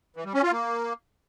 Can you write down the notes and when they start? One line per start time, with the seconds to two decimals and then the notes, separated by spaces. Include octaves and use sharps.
0.16 E3
0.25 G3
0.34 C#4
0.43 F4
0.52 A#3